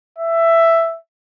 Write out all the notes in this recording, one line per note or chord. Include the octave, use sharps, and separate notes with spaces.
E5